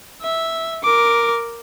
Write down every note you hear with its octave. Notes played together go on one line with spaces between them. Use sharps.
E5
A#4 D6